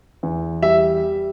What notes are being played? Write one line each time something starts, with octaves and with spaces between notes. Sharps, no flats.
E2
G3 E5